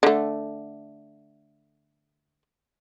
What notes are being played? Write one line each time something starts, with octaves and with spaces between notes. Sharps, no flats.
D3 A3